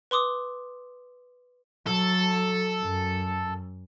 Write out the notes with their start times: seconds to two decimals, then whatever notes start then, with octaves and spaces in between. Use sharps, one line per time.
0.11 B4 C6 D6 D#6
1.87 F#3 A4
2.82 F#2